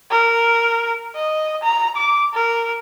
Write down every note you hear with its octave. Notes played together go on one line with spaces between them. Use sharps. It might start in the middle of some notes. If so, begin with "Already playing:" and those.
A#4
D#5
A#5
D6
A#4